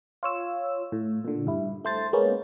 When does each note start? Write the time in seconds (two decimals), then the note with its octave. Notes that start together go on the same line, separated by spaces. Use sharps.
0.23 F4 C#5 E6
0.92 A2
1.25 A#2 D3
1.47 G2 E4
1.85 A3 C5 A6
2.13 G#3 A#3 B3 C#4